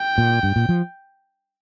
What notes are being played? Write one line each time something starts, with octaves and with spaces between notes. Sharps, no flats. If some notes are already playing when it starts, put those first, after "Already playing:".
Already playing: G5
A#2
G2
A#2
F3